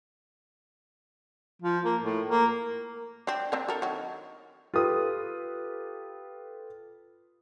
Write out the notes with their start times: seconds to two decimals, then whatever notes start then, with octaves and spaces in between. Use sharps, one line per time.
1.62 F3
1.85 A#3
2.03 A2
2.28 A#3
3.27 C4 D4
3.52 C4 D4 A#4
3.69 A4 A#4
3.82 D#3 F#3
4.74 F4 G4 A4 B4 D#6